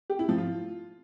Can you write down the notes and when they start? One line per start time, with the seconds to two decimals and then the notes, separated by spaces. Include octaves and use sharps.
0.10 G4
0.19 E4
0.29 F3
0.38 F4